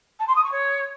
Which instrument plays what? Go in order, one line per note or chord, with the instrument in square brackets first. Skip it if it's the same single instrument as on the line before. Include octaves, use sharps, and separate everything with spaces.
[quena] A5
C6
D#6
C#6
C#5